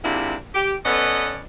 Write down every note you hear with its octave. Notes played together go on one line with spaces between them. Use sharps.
G#2 C3 F3 A#3 D4 E4
G4
B3 C#4 A4 B4 D5 D#5